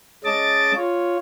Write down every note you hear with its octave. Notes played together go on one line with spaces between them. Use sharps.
G#3 C#4 D#5 A5 D6 A6
F4 C#5